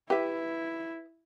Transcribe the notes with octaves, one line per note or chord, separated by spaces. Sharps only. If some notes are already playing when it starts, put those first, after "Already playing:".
E4 G4 B4 E5